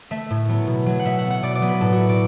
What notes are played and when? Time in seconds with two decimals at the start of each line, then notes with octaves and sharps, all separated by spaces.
0.11 A3 E5
0.30 A2
0.48 F#3 B3
0.67 B2
0.86 F#3 A3
1.00 F#5
1.05 B2 E5
1.18 F#5
1.25 B3
1.30 F#5
1.43 B2 D5
1.55 D5
1.62 F#3 B3
1.69 B4
1.80 A2 A4
1.93 F#4
2.00 A3
2.09 D5